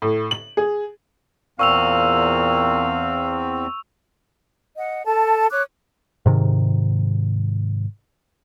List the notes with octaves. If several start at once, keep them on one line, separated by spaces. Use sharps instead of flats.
A2
F#7
G#4
E2 A#2 C4 F5 C#6 E6 F7
D#5 F#5
A4 A5
C#5 D6 F#6
G#2 C3 D#3